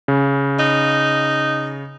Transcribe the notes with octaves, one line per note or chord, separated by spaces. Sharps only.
C#3
D#4